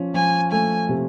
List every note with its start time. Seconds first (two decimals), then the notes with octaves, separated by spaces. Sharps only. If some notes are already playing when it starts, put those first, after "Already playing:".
Already playing: F3 C#4
0.14 F3 G#5
0.52 A3 G#5
0.89 C3